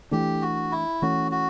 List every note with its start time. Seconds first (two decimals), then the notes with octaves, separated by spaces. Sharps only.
0.11 E3 A3 D4 G4
0.42 F#4
0.72 E4
1.02 E3 A3 C#4 F#4
1.32 F#4